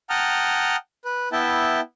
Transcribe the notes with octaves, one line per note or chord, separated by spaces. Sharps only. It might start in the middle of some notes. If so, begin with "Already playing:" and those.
F#5 G5 A5 A#5 D#6 F6
B4
B3 E4 E5 G5 A5